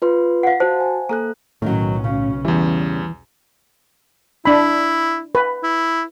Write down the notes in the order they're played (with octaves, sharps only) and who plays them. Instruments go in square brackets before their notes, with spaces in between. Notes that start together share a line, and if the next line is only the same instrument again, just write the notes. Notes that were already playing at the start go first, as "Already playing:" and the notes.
[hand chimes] F4 B4 C6
[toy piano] F5 F#5
[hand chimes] F#4 A5 [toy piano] C5
[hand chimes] G#5
[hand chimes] A#3 A4 F#6 [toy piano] A#5
[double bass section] B1 C#4 [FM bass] A2 [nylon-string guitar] D#3 F#3
[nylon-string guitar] C#3
[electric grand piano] E2 G3 [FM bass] E3
[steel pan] D4 B5 [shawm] E4
[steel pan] B4
[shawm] E4